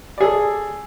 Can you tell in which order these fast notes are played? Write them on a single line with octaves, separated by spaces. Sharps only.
D5 G#4 A4